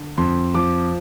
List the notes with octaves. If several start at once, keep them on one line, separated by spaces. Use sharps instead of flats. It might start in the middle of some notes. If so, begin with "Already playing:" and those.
Already playing: D3
F2 C6
F3 D6